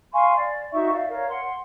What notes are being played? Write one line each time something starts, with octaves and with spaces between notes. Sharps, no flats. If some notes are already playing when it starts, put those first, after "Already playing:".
F5 G#5 C6 C#6
D5
D#4 F#4 E5 C#6
D5 E5 F5
A#4 C#5 F5
F#5 C6